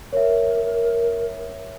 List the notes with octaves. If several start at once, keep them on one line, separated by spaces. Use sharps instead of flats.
A#4 C#5 E5